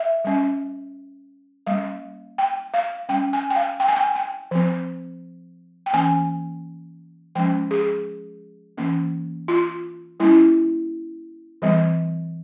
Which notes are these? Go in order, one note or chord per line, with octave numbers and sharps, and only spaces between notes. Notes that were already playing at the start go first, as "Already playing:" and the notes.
Already playing: E5
G3 C#4
G3 A#3 C#4 F5
G5
F5
G3 C#4 G5
G#5
G5
F5
G5
G#5
G5
G5
F3 C4
G5
E3 A#3 C#4 G#5
F3 G#3 C#4 G5
G#4
E3 A#3 C#4
F4
G3 A#3 C#4 E4
E3 G3 C4